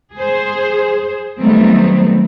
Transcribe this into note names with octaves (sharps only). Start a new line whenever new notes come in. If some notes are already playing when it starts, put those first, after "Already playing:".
G#4 C5
D#3 F#3 G3 A3 B3 C4